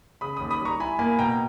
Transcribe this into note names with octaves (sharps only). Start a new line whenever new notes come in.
C#3 B5 D#6
D#2 B5 D#6
B5 D#6
G3 A#5 C#6
E4 G#5 B5
A#3 G#5 B5
B2 G5 A#5